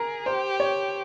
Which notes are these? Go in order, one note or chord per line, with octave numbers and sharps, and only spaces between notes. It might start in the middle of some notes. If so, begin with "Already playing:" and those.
Already playing: G#4 A#4
G4 C5
C#5